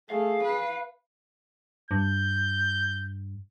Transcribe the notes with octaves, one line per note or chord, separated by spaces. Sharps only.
A3 G#4 F5
B4
G2 G6